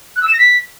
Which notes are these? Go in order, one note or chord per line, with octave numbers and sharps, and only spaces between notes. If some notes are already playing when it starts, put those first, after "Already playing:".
F#6
E6
E7
A#6
B6